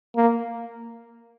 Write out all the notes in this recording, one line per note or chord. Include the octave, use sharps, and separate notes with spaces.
A#3